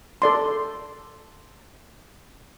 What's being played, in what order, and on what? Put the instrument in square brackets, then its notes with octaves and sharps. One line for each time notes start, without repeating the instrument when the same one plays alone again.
[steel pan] A4 D5 C6